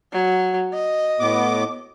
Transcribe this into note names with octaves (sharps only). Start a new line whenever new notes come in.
F#3
D#5
A2 B3 D6